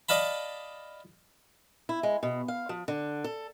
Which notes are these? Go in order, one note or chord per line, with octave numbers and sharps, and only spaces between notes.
D5 D#5 F5 A5 B5
E4
G#3
B2
F5
F3
D3
A4